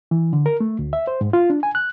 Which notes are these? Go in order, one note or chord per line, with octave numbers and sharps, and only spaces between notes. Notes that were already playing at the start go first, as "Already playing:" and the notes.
E3
D3
A#4
A3
D2
E5
C5
G#2
F4
D4
G#5
F#6